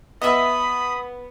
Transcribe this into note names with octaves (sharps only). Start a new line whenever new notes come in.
B3 D#5 E5 B5 D#6